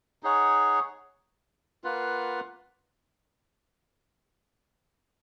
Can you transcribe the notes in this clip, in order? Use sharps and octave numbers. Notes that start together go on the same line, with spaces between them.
D#4 G#4 C#5 F#5
A#3 F4 B4 F#5